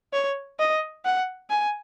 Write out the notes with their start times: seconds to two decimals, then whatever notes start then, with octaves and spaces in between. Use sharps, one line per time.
0.13 C#5
0.59 D#5
1.05 F#5
1.50 G#5